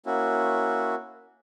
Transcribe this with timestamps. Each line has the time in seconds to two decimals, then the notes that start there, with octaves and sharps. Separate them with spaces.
0.06 A#3 C#4 E4 F#4